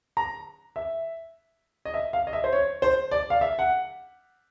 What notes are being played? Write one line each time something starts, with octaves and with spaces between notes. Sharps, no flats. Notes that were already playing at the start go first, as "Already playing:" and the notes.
A#5
E5
D#5
E5
F5
D#5
E5
C5
C#5
C5
D5
F5
E5
F#5